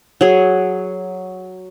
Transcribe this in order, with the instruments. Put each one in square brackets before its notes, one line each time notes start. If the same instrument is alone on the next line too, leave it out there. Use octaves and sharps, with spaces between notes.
[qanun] F#3 G#4